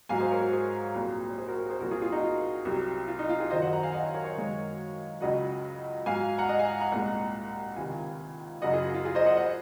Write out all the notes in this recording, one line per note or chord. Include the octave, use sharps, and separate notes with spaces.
G#2 F#3 F5 G#5
G#4 C5
A#4 C#5
F#4 A#4
G#4 C5
C2 A#2 F#3
C#5
G#4 C5
F#4 A#4
G#4 C5
C2 A#2 F3 F#4 A#4
F4 G#4
F4 G#4
D#4 F#4
F4
C2 C3 F#3
F4
D#4
F4
F4 G#4
F#2 D#3 F#3 C5 D#5
D#5 F#5
F#5 A#5
F5 G#5
D#5 F#5
C#5 F5
A#4 C#5
C#5 F5
F#2 D#3 G#3
C#2 C#3 F#3 D#5 F#5
G#2 F#3 F5 G#5
F#5 A#5
D#5 F#5
F5 G#5
F#5 A#5
C2 A#2 G#3 F#5 A#5
C#2 C3 D#3 F5 G#5
F#2 C#3 F#3 D#5 F#5
F4 G#4
F4
F4 G#4
C5 D#5
D#5 F#5
D#5 F#5